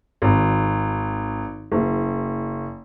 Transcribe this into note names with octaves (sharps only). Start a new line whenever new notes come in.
G#1
F#1